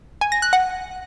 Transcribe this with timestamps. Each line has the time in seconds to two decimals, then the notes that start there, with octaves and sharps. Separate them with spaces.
0.21 G#5
0.32 A#6
0.42 F#6
0.53 F#5